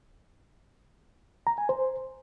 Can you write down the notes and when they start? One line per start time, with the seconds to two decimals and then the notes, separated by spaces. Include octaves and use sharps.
1.47 A#5
1.58 G#5
1.69 C5